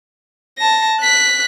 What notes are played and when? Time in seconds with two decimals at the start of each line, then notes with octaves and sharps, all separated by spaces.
0.58 A5 A#6
1.00 F#6 B6